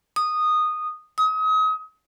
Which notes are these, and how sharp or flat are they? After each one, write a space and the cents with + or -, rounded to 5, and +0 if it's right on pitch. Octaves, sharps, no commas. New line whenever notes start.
D#6 -10
D#6 +35